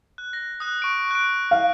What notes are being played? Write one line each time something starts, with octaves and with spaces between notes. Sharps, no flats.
F#6
A#6
D#6 F#6
C#6 D7
F#6 D7
F5